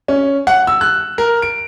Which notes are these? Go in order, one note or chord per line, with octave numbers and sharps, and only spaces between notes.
C#4
F#5
E6
F#6
A#4
D7